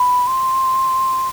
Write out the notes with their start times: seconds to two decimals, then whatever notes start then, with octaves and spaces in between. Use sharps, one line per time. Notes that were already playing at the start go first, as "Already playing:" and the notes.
Already playing: B5
0.27 C6